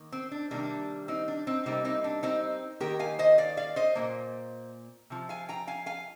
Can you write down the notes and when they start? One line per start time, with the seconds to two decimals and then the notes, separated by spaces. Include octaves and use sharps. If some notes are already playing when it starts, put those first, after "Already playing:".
Already playing: D#3 A#3
0.12 C4
0.31 D4
0.51 C3 D#3 G3 A#3 D4
1.08 C4 D#4
1.28 D4
1.47 C4 D#4
1.66 C3 G3 A#3 C4 D#4
1.85 C4 D#4
2.04 D4
2.23 C4 D#4
2.80 D#3 A#3 G4 A#4
2.99 F5 G#5
3.19 C5 D#5
3.38 D5 F5
3.57 D5 F5
3.76 C5 D#5
3.95 A#2 F3 A#3
5.10 C3 F3
5.29 F5 G#5
5.49 G5 A#5
5.67 F5 G#5
5.86 F5 G#5